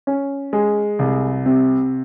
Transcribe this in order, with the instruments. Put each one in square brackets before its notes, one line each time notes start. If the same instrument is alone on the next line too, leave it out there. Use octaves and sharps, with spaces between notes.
[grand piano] C#4
G#3
C2
C3